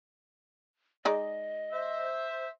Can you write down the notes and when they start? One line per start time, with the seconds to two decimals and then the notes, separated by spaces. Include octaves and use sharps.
1.05 G#3 D#4 D5 D#5
1.72 C5 E5